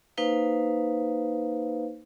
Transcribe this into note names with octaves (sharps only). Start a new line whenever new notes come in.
A#3 D#4 B4 C5 F5